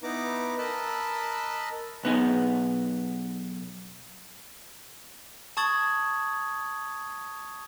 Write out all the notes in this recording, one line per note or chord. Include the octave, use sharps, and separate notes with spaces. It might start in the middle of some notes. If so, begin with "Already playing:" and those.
B3 D#4 E4 B4 A#5 D6
A#4 D#5 A5 B5 E6 F#6
B1 B3 D#4 G#4
A5 C#6 D#6 G#6 A6 F#7